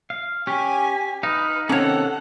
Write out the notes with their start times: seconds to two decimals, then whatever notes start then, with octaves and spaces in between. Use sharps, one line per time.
0.10 F5
0.47 C#4 G4 G#5
1.23 D#4 B4 F5
1.69 C3 D#3 A#3 C#4 A4 C#5 F#5